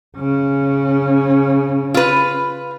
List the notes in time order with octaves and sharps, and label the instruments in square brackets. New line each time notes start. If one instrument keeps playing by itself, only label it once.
[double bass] C#3 C#4
[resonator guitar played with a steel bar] F4 B4